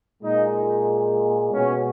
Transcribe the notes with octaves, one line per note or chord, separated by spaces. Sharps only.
A#2 G#3 D#4
B2 G#3 C#4